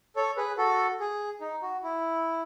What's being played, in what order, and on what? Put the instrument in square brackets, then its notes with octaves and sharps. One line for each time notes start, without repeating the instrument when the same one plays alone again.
[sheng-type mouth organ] A4 C#5
G#4 B4
F#4 A4
G#4
D#4
F#4
E4